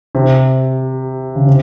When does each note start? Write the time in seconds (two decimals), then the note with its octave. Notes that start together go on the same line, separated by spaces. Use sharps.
0.15 C3
1.35 C#3
1.47 C3